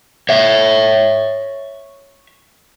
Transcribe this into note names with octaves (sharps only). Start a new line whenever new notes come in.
C#5 E5